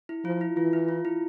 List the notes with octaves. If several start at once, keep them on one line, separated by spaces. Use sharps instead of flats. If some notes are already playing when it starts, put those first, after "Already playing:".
E4
F3 F4
E4
E3 F4
E4
F4
E4